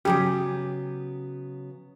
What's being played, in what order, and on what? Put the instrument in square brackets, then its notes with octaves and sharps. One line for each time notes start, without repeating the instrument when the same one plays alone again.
[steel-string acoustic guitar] C#3 F#3 B3 [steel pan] G4 G#4